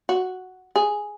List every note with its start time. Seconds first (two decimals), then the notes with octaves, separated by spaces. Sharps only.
0.09 F#4
0.76 G#4